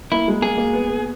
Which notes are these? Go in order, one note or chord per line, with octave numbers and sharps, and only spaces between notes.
A#3 E4
G#3
A#3 G#4
A#3
B3
B3